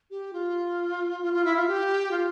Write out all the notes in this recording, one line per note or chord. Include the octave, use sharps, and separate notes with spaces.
G4
F4
F4
F4
E4
F4
G4
F4